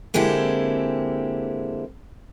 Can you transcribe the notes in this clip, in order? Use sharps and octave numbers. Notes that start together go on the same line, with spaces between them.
D3 G#3 A#3 C4 E4 G4